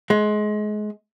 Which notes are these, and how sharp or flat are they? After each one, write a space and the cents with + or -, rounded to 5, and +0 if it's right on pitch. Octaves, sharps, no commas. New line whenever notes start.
G#3 +25